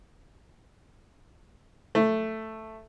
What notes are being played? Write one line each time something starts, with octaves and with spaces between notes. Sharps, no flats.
A3